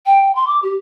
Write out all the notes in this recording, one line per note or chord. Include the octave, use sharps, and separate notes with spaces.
G5
C6
D6
G4